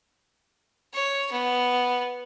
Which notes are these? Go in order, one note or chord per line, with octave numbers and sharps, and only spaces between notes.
C#5
B3